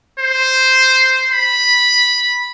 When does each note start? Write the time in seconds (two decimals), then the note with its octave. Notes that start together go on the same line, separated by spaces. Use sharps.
0.19 C5
1.32 B5